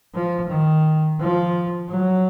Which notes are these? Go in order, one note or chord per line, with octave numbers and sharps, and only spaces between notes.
F3
D#3
F3
F#3